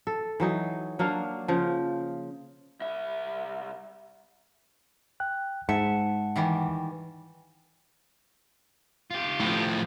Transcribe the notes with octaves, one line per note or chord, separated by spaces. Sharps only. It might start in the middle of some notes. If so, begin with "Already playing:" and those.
A4
E3 F#3 D#4
F#3 A#3 D4 F5
C#3 F3
C2 E5
G5 F#6
G#2 E5 F#5 A5 C#7
D#3 E3 G3
F4 G4
A2 F3